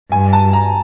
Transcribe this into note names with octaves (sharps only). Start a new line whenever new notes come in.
G2 G#5
A5
A#5